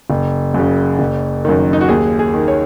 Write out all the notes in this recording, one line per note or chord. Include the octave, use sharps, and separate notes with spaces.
F#1
F#2 C#3
F#1
F#2 D#3
D#4
F#4
D#2 G#4
G#4
D#3
C#5